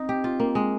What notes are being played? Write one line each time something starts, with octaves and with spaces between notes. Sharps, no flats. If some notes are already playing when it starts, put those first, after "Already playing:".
Already playing: C4 D#4
G4
F4
A#3
G#3